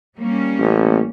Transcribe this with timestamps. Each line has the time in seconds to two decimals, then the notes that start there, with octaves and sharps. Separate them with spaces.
0.17 G3 A#3 C#4
0.59 A1